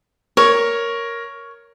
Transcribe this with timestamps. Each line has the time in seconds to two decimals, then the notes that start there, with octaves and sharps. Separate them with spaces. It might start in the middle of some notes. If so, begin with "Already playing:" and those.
0.37 A#4 C#5